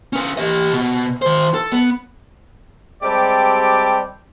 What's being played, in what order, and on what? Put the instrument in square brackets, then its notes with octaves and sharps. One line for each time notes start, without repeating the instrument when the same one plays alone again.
[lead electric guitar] C#4 B4
G4 D#5
B2
D#3 C5
A4
B3
[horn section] G3 G#3 C4 G4 A4 D5